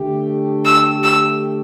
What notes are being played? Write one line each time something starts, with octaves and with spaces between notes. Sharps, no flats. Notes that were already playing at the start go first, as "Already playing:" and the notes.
Already playing: D3 A3 G4
E6
E6